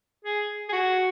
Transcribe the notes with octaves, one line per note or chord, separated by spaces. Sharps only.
G#4
G#4
F#4